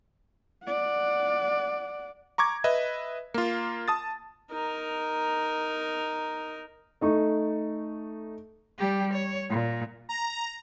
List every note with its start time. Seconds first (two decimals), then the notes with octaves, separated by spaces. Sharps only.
0.64 D5 F#5
2.38 A#5 C#6 D6 G#6
2.64 B4 D#5 E5
3.34 A#3 F4
3.88 A5 D#6 A6
4.52 D#4 A#4
7.01 A3 D#4 C#6
8.79 G3 G4
9.13 C#5
9.50 A#2
10.09 A#5